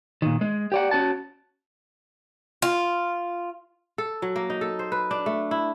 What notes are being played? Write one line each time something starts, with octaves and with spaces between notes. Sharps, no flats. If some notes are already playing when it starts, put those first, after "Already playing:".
A#2 D#3
G#3
G4 D5 F#5
C#4 F#4 A5
F4
A4
F#3
A#3
D#4
A4
C5
B4
D4
A3
E4